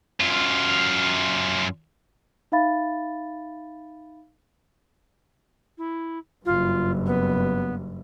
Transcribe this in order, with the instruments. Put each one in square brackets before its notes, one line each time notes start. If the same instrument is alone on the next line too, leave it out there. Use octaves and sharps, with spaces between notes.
[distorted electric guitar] F#2 F4
[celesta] D#4 E5 F5 B5 A6
[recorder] E4
[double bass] F#1 G2 [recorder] F4
[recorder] B3